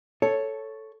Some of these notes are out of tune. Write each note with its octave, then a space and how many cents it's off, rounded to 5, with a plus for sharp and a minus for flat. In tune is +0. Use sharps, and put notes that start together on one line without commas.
A4 +0 C#5 +0